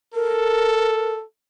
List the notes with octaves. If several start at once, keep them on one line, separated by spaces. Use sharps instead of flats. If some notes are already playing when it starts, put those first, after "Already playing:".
A4 A#4